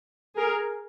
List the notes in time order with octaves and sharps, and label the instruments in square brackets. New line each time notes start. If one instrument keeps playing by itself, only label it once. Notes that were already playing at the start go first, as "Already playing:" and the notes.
[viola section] G#4 A#4